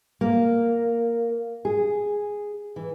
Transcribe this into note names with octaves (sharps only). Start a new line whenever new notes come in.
A#3
G#4
E3